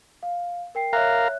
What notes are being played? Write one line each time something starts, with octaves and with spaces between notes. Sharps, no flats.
F5
A#4 G5 C7
A#4 C#5 E5 F5 A#5 F#6